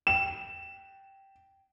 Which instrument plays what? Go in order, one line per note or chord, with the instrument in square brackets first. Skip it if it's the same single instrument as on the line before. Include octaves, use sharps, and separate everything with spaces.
[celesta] G5 [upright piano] E7